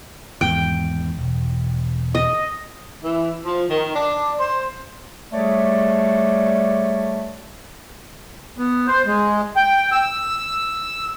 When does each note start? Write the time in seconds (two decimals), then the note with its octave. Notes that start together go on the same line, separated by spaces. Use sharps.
0.41 G#1 E2 G#2 G5
1.19 E1
2.15 D#5
3.03 E3
3.45 F3
3.69 D#3
3.95 D4
4.39 C5
5.33 G3 A3 G#4 C#5 D5
8.58 B3
8.88 C5
9.06 G#3
9.56 G5
9.92 E6